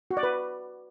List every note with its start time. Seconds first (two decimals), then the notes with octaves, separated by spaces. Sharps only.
0.11 F#4
0.17 D5
0.23 B4